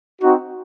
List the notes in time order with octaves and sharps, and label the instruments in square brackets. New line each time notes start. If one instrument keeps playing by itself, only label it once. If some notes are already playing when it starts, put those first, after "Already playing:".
[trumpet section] C4 D#4 F#4